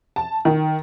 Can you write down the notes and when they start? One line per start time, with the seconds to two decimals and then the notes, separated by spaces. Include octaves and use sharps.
0.16 A5
0.45 D#3